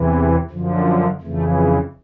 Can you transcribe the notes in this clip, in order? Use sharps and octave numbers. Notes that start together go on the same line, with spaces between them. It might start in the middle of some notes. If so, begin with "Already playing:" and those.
Already playing: E2 C3 E3
B3
F#2 D3 F3
F2 C#3 E3 A3